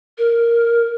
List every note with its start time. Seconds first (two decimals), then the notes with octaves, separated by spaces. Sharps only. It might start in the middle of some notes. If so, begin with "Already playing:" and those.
0.18 A#4